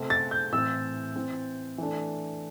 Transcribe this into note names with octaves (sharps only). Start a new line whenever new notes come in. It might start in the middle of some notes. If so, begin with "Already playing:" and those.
Already playing: C3 A3 C4
A6
G6
A2 E3 C4 E6
E3 C4
E3 A3 D4